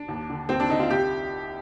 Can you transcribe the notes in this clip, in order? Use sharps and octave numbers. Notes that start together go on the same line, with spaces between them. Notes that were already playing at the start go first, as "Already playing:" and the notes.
Already playing: D4
D#2
D3
D#2 C4
D4
D3 D#4
F4
C2 G4